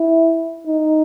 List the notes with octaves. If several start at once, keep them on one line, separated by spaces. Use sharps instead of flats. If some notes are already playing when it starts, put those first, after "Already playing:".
Already playing: E4
D#4